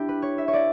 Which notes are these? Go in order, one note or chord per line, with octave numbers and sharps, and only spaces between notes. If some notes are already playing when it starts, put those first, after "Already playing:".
Already playing: D4 E4 G4
B4
C#5
E5
C#5
D5